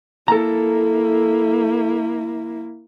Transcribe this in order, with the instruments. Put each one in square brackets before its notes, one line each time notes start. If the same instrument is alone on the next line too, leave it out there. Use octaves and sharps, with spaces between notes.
[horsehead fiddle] A#3 E4 [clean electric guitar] A4 A#5